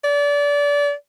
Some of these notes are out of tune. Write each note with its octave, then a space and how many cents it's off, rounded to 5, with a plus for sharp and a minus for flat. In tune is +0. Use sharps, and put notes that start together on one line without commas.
D5 -30